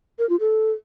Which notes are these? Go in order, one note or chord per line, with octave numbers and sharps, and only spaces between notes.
A#4
F4
A4